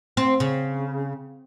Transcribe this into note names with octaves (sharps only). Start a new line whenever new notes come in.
C4
C#3